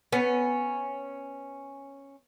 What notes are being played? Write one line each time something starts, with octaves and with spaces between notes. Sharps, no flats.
B3 C#4